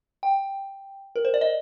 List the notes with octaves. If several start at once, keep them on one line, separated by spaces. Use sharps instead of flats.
G5
A#4
C5
D5
D#5